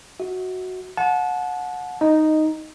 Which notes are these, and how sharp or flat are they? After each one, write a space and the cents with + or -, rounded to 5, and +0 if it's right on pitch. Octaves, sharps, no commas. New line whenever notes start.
F#4 +0 E5 -40
F#5 -25 A5 -30
D#4 +0 D#5 -10